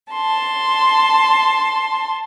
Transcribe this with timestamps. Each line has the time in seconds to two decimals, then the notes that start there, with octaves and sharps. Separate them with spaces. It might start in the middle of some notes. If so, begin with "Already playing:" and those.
0.11 A5 C6